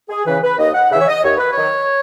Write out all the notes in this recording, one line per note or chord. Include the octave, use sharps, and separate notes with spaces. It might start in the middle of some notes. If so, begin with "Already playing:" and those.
G#4
C#3 E3 B4
B4
D#2 D#5
F#5
C#3 E3 E5
C#5
D#5
D#2 C#5
B4
C#5
D#3 F#3